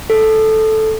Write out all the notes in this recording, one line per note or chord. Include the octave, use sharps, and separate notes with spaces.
A4